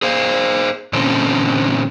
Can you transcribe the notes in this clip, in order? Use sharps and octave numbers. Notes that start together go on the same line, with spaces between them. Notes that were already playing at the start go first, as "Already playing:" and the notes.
G#4 C5 F5
A#2 D3 E3 C4 C#4 A4